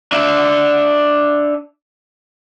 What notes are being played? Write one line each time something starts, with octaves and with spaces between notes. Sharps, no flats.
D4 E5